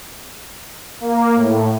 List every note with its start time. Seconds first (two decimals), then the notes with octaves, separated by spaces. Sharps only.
1.01 A#3
1.35 A2